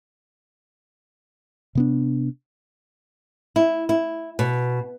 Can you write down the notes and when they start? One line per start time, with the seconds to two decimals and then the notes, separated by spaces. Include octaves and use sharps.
1.75 C3 B3 D4
3.56 E4
3.89 E4
4.39 B2